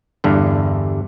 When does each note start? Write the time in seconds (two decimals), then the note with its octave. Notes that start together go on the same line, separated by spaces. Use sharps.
0.24 E2 G2 D3